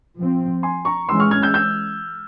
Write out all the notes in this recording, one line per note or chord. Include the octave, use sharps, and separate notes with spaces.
F3 C4
G#5 C6
A#5 C#6
E3 G#3 C#4 C6 E6
C#6 F6
F6 G#6
E6 G6
E6 G6